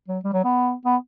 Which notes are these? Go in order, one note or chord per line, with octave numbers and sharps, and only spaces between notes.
F#3
G3
F#3
B3
B3